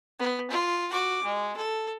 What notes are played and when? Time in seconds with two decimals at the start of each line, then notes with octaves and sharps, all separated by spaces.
0.19 B3
0.50 F4
0.91 F#4 D6
1.24 G#3
1.56 A4